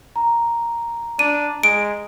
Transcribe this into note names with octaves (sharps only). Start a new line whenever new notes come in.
A#5
D4 D#7
G#3 D7